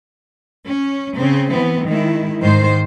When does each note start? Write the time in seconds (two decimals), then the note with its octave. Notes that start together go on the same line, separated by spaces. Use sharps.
0.67 C#4
1.17 C#3 C4
1.51 E3 B3 C4
1.87 D#3 G#3 E4
2.40 G#2 D#3 C5